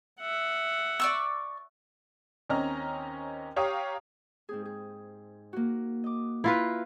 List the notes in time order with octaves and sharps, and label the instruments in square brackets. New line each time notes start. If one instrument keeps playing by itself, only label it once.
[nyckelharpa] E5 F#5
[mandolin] D5 C#6 E6
[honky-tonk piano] D#2 C4 C#4 D#5 A#5 F6
G4 C#5 F5 G5 A#5 D#6
[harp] G#2 C4 G#4
G#4
A#3 F#4
D#5 D6
[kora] E4 F4 B4 [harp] F5 A#5 C6